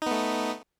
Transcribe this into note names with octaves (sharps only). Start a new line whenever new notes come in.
A3 B3 D#4